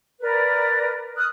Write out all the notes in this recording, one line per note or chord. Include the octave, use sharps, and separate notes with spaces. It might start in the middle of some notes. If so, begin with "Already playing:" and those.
A#4 B4 D5
D#6 F6 F#6